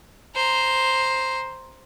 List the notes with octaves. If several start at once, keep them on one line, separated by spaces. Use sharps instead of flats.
C5 A#5